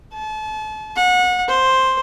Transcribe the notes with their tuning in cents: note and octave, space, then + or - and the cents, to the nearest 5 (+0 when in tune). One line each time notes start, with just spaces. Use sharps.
A5 -35
F#5 -30
C5 +5